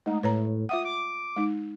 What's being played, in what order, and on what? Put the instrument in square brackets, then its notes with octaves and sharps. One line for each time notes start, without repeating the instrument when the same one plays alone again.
[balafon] G#3 A3 [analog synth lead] D#4
[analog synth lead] A2 [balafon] B4 C#5 A#5
[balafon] F4 E5 F#5 [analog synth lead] D#6
[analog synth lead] D6
[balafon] G#3 D#4